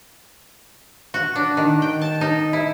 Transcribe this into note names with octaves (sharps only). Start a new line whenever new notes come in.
F#4
D4
D#3
G5
A5
D#4
E4